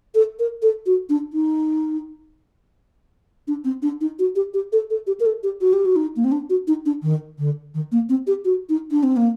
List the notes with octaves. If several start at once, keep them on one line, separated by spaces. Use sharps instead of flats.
A4
A#4
A4
F#4
D4
D#4
D4
C4
D4
D#4
F#4
G4
G4
A4
A4
G4
A#4
A4
G4
F#4
G4
F#4
D#4
A#3
C4
D4
F#4
D#4
D4
D#3
D3
D#3
A#3
C4
G4
F#4
D#4
D4
C4
A#3